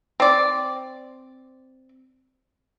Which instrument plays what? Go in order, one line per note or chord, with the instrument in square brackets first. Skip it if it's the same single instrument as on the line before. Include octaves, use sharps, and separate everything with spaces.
[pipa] C4 D5